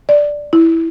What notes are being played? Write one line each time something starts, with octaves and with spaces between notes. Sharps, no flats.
D5
E4